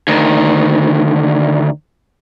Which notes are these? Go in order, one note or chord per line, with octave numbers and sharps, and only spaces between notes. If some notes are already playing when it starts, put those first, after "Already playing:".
D2 D#3